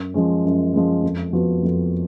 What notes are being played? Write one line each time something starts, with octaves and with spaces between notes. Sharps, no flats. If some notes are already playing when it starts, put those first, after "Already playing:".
Already playing: F#2
F3 G#3 C#4
F#2
F3 G#3 C#4
F2
F3 B3 F#4
F2